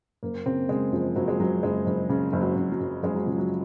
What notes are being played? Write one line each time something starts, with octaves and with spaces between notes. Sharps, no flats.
F#1 A#3
C#3 C4
C#3 G#3
F#1 F3
F#1 F#3
G#3
F#1 F#3
F#1 G#3
F#1
C#3
F#1
F#3
F#1
F#3
F#1
F#1 G#3
F#3
C#3 F3
F#3